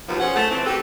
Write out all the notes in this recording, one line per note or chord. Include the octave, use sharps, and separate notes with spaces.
D#2 B2 F3
C#4 G#4 C5 F#5
A3
E3 C4
F#4 G4 A4 B4